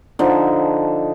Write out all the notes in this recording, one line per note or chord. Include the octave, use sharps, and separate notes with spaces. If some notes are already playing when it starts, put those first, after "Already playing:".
D3 F3 D#4 A4